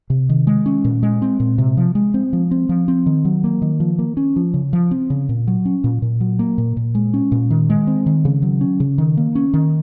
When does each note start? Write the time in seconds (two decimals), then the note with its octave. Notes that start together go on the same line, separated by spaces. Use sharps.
0.10 C3
0.29 D#3
0.47 G#3
0.66 C#4
0.85 A#2
1.03 G#3
1.22 C4
1.40 A#2
1.58 C3
1.77 F3
1.95 G#3
2.14 C4
2.33 F3
2.51 C4
2.69 F3
2.88 C4
3.06 D#3
3.25 F#3
3.44 A#3
3.62 D#3
3.80 F3
3.99 A#3
4.17 C#4
4.36 F3
4.54 C#3
4.73 F3
4.91 C4
5.10 C#3
5.29 A#2
5.47 F#3
5.65 C#4
5.84 A#2
6.02 A#2
6.20 F#3
6.39 A#3
6.58 A#2
6.77 A#2
6.95 G#3
7.14 C#4
7.32 A#2
7.51 D#3
7.70 G#3
7.87 C4
8.06 D#3
8.25 C#3
8.42 F#3
8.61 C#4
8.80 C#3
8.98 D#3
9.17 A#3
9.35 C#4
9.53 D#3